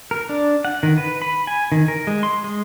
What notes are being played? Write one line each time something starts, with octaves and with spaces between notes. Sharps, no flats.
A#4
D4
F#5
D#3
B4
B5
G#5
D#3
A#4
G#3
C6
G#3